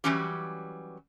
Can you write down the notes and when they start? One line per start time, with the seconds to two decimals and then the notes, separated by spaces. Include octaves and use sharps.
0.04 E3 F#3 G3 C#4 G4